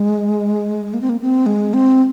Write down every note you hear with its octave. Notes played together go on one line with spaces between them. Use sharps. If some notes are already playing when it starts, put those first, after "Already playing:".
Already playing: G#3
A#3
C4
A#3
C4
G#3
C4